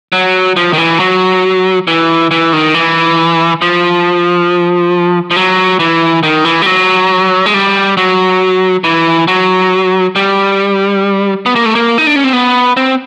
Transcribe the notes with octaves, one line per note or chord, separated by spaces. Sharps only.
F#3
F3
D#3
E3
F#3
E3
E3
D#3
E3
F3
F3
F#3
E3
D#3
E3
G3
F#3
G#3
G3
F#3
E3
F#3
G3
B3
A#3
A3
A#3
D#4
D4
C#4
C4
B3
C4